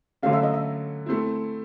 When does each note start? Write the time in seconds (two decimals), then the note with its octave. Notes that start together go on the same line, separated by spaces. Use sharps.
0.22 D3 F#3 A3 C#4 F5
0.33 E5
0.43 D#5
0.54 E5
1.06 A3 C4 E4